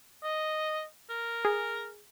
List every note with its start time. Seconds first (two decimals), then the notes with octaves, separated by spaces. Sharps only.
0.23 D#5
1.09 A#4
1.45 G#4